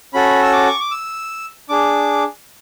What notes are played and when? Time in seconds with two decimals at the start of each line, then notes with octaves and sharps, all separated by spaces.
0.14 C#4 F#4 A4 B5
0.43 E6
0.53 D6
0.68 C#6
0.80 D6
0.91 E6
1.69 D4 G#4 D6